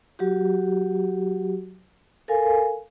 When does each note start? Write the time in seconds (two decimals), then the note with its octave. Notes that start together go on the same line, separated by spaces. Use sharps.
0.19 F#3 F#4 G4
2.28 A4 A#4 F5 G#5